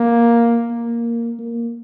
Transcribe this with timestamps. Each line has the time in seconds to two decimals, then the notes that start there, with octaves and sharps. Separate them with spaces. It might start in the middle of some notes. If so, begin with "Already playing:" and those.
Already playing: A#3
0.71 A#3
1.39 A#3